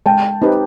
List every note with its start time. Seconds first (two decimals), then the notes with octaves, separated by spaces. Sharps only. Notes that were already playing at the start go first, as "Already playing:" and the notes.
0.06 G#3 G5 A5
0.42 C4 D#4 G4 B4